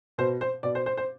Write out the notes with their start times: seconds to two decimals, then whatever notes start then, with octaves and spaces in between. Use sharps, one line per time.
0.18 B2 C5
0.41 C5
0.63 B2 D5
0.75 C5
0.86 C5
0.97 C5